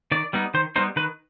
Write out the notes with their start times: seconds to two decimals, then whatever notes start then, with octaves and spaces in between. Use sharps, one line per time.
0.12 D#3 D5
0.33 G3 B3 D#4
0.54 D#3 C5
0.76 G3 B3 D#4 C5
0.96 D#3 B4